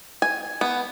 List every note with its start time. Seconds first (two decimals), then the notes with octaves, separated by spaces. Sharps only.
0.22 G#5
0.61 B3